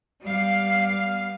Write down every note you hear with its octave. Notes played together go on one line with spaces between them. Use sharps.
G3 B3 F5